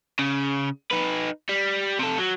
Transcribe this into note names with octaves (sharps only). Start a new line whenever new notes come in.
C#3
D#4 B4
G3
C3 A4
F#3